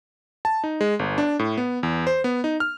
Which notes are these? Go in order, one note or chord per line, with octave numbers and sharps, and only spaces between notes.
A5
D#4
G#3
G1
D4
A2
B3
E2
C5
B3
D#4
F6